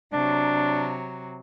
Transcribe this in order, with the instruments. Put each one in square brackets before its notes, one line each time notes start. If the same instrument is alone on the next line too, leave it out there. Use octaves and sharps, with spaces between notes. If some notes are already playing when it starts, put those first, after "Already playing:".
[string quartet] C3 F#3 [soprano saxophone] D4